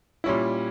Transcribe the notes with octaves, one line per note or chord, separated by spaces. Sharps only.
A#2 G3 C#4 E4